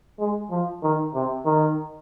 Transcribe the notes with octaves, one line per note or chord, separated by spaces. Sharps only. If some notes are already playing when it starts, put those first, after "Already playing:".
G#3
F3
D#3
C3
D#3